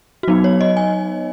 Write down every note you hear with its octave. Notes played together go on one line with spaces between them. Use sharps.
F#4
F#3 B3 D#4
C#5
D#5
G#5